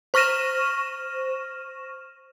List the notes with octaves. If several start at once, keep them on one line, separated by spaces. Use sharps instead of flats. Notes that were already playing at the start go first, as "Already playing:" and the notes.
C5 C#6 F6 A#6 D#7 E7